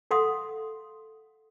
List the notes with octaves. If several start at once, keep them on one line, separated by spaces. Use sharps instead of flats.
A4 F5 F#5 C6 D#6